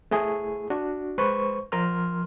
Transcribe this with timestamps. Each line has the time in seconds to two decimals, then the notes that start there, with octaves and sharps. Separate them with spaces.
0.11 A3 E4 G#4
0.70 D4 F#4
1.18 G#3 B4 C5 C#6
1.72 F3 A#4 C6 F6